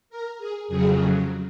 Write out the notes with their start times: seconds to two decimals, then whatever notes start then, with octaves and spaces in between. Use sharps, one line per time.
0.10 A#4
0.38 G#4
0.68 F2 C#3 F#3 G#4